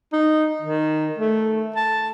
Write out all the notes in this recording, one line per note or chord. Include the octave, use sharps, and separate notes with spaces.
D#4
D#3
A3
A5